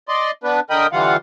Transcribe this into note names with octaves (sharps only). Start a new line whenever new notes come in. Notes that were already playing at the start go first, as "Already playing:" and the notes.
D5 D#5 C6
B3 D4 B4
D3 A#4 D#5 G5 B5 D#6
D3 E3 G3 F4 F5 F#5